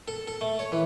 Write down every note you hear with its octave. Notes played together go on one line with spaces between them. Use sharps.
A4
A4
A3
C#5
E3